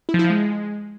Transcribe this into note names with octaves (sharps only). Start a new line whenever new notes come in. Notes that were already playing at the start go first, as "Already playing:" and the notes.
E4
F3
E4
F3
G#3